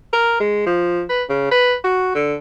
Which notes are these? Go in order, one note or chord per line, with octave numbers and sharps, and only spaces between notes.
A#4
G#3
F3
B4
C#3
B4
F#4
D3